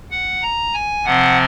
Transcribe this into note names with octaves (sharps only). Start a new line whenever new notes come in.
F#5
A#5
G#5
C3 F3 C4 F#5